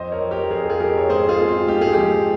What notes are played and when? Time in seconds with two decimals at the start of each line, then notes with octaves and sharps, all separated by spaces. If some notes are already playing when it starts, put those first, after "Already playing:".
Already playing: F2 C5 D#5
0.12 A#4 C#5
0.21 F2
0.31 G4 A#4
0.50 F2 G#4
0.60 A#4
0.69 F4 G#4
0.80 F2 G4 A#4
0.98 C#5
1.09 G#2 G#4 C5
1.29 F4 G#4
1.39 C4
1.49 F4
1.68 G#2 G4
1.81 G#4
1.93 F3 G4